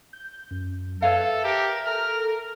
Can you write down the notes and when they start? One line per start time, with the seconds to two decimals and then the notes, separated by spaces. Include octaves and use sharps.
0.13 G6
0.51 F#2
1.02 A4 B4 C#5 E5 F5
1.44 G4 A#4
1.87 A4 A#4 F6